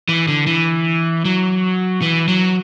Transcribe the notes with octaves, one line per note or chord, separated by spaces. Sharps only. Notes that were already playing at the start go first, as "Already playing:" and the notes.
E3
D3
E3
F#3
E3
F#3